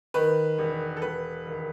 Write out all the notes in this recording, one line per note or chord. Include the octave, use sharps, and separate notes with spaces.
D#3 B4
E1
A4
E1 B4
D#2